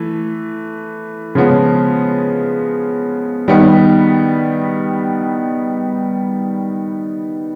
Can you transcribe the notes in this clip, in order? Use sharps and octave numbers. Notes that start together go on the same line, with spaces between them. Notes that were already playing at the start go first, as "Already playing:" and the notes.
Already playing: E3 A3
C#3 F3 G#3 B3
D#3 G3 B3 D#4